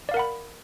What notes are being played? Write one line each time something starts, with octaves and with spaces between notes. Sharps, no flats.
A#4 D5 F5 F#5 B5